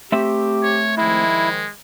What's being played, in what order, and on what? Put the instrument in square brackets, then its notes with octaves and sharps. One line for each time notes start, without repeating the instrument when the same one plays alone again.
[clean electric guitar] A3 C4 E5 [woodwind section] G4
[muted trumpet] C#5
[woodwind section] D#3 F3 [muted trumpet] G#3 [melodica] E4